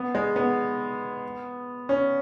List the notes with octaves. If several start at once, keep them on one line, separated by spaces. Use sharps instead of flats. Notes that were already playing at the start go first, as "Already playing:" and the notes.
Already playing: B3
G#3
B3
C#4